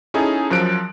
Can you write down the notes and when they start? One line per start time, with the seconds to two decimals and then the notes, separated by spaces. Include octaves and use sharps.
0.14 C#4 D#4 E4 G#4 A4
0.50 F#2 F3 F#3 F#6 D7